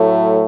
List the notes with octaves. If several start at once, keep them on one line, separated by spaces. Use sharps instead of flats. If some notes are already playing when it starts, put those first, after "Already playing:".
Already playing: A2 F#3 A3